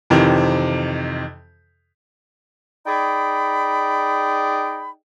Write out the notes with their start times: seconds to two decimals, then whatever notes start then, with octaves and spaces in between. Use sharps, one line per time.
0.10 F2 C3 D#3 E3
2.86 D#4 G#4 D5 G5 B5